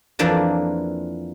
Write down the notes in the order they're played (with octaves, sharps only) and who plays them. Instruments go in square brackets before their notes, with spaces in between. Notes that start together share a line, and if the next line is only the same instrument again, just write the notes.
[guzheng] F2 E3 F3 A#3 D4 A5